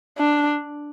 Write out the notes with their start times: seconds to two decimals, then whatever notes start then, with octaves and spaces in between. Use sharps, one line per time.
0.18 D4